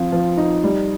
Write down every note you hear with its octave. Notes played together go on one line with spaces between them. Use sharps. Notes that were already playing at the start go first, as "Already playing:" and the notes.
Already playing: F2 F3
F3
D#4
G3